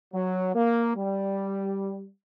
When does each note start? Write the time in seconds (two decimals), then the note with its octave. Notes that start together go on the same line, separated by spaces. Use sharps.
0.14 F#3
0.55 A#3
0.97 G3